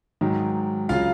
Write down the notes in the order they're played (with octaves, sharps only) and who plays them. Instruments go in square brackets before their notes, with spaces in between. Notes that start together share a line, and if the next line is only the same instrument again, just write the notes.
[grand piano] G#2 D#3 F#3
C#3 F#3 F4 F5